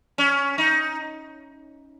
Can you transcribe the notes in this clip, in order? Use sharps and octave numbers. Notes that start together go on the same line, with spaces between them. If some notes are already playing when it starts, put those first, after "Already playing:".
C#4
D#4